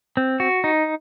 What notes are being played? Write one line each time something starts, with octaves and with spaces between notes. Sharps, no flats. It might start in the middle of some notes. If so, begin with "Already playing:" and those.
C4
F#4
D#4